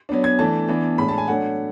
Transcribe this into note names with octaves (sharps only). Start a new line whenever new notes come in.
F#3 B3 D4
G#6
E3 A3 D4 A5
E3 B3 D4
A2 G#3 D4 B5
A5
G#5
F#3 A3 D4 F#5